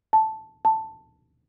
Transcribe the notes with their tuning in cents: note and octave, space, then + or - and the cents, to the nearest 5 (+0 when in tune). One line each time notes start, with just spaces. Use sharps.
A5 -5
A5 +5